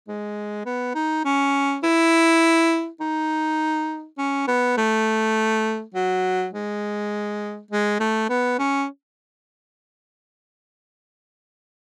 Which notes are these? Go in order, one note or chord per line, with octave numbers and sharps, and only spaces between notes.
G#3
B3
D#4
C#4
E4
D#4
C#4
B3
A3
F#3
G#3
G#3
A3
B3
C#4